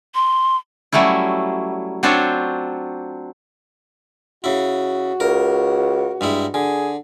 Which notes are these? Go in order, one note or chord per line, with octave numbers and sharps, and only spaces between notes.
C6
F#3 G3 A3 C#4 E4
F#3 C4 D4 F4 C5 C#5
C#3 E4 F#4
C#2 A#4
G2 G#3 E4
D3 G#4